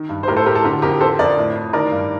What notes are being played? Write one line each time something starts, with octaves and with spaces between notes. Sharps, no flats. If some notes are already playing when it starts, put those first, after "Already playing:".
Already playing: D#3
G2
C5
A2 G4 A#4
A4 C5
A2 G4 A#4
A4
D3 G4 A#4
F2 G4 A#4
D3 A4 C5
F2 A#4 D5
A2
A2
D#3 A#4 D5
G2